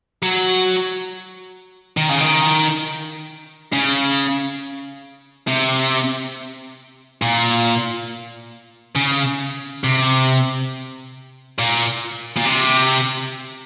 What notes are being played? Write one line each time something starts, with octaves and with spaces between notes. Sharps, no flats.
F#3
D#3
C#3
D#3
C#3
C3
A#2
C#3
C3
A#2
A#2
C3